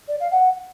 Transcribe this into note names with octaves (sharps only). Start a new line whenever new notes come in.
D5
F5
F#5